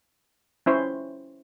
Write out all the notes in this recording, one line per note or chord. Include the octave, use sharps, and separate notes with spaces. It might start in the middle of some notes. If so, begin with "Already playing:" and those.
C#4 E4 C5 C#5